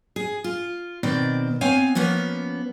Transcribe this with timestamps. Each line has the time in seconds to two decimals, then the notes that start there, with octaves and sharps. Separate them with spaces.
0.16 G#4
0.44 F4
1.03 B2 D#3 C4 D5
1.61 B3 C4 C#5 F5 G#5
1.95 F3 A#3 B3 C#4